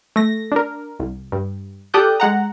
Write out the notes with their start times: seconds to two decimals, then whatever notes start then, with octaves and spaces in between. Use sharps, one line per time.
0.16 A3 A#6
0.52 D4 A#4
1.00 C2
1.32 G2
1.94 G4 A4 D5 D#6 F#6 G6
2.20 G#3 F#5 A#5